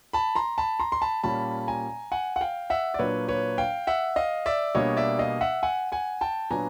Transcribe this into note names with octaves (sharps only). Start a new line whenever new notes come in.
A5 B5
A#5 C6
A5 B5
A#5 C6
C6
A5 B5
A#2 G3 A#3 C#4 A5 B5
G#5 A#5
F#5 G#5
F#5
F5 G5
E5 F#5
D5
A#2 F#3 A#3 D4 B4 C#5
B4 C#5
F5 G5
E5 F#5
D#5 F5
D5 E5
B2 G3 A#3 D4 C#5 D#5
D5 E5
D#5 F5
E5 F#5
F#5 G#5
F#5 G#5
G5 A5
A#2 F#3 B3 D4 G#5 A#5